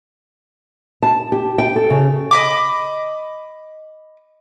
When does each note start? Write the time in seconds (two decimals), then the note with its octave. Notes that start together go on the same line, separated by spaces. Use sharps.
1.02 A5
1.32 G4
1.58 G5
1.76 A4
1.90 C#3
2.31 D#5 B5 D6